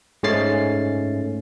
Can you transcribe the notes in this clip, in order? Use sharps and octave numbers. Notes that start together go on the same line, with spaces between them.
G#2 G#3 A3 C#4 A6 C7